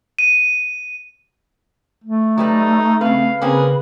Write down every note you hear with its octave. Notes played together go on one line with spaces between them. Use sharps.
D#7
A3
F#3 G3 D#4 B4
C#3 C4 B4 F5
C#3 A#3 C4 C#4 G#4 B4 B5